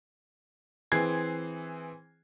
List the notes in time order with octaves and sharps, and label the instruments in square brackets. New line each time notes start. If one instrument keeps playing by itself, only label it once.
[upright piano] E3 C4 G#4 G#6 C7